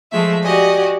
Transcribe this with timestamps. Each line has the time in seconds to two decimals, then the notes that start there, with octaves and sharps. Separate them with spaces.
0.12 F3 G#3 A3 E5
0.44 F#4 G4 D5 D#5 G#5